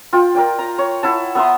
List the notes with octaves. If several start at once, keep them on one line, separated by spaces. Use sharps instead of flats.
F4 G5
A#4 D5 G5
A#5
C#5
E4 F#5 A5
B3 E5 A#5 C6